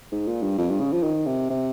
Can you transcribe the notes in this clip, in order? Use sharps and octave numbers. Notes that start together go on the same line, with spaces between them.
G#2
A#2
G2
F2
G2
C#3
F3
D#3
C3
C3